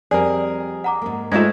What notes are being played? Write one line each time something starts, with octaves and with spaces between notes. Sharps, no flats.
F2 G3 C4 G#4 A#4 D5
F#5 A#5 D6
G#2 A#3
G#2 G#3 A3 D#4 F4 G#6 E7